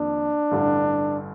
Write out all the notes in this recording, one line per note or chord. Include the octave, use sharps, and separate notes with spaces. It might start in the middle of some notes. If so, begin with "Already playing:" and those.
Already playing: F2 D#3 A#3 D4
A1 G2 D3